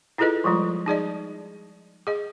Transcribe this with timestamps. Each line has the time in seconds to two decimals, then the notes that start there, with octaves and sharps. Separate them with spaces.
0.18 E4 F4 G#4 A4 B4 D#5
0.44 F3 G3 G#3 F4
0.86 D#4 G#4 D5 D#5
2.07 G#4 D#5